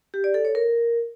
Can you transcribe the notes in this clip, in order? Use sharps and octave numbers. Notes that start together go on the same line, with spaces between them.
G4
D5
A4
C#5
A#4